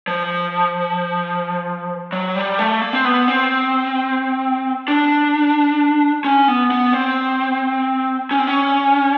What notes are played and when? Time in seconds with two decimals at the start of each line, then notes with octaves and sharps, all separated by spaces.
0.08 F3
2.12 F#3
2.36 G3
2.59 A3
2.82 A#3
2.93 C4
3.05 B3
3.28 C4
4.88 D4
6.24 C#4
6.48 B3
6.71 B3
6.93 C4
8.31 C#4
8.39 C4
8.47 C#4